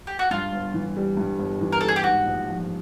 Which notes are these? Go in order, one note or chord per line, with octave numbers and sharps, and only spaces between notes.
G4
F#4
G2 F4
G1
E3
G3
G2
G1
E3
A#4
G3 A4
G#4
G4
G#2 F#4
A#1
F3